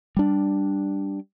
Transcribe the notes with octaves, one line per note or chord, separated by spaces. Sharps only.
G3 D4